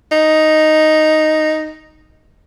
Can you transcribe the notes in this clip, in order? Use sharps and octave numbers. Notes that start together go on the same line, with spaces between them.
D#4